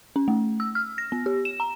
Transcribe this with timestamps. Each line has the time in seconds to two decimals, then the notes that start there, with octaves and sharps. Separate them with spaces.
0.16 C#4
0.28 A3
0.60 E6
0.75 F6
0.98 A#6
1.12 B3
1.26 G4
1.45 E7
1.60 A#5